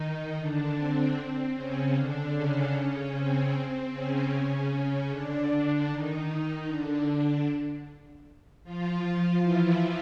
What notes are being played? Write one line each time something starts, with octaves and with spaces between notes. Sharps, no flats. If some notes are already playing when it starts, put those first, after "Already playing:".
Already playing: D#3 D#4
D3 D4
C4
C#3 C#4
D3 D4
C#3 C#4
C4
C#3 C#4
D3 D4
D#3 D#4
D3 D4
F3 F4
E3 E4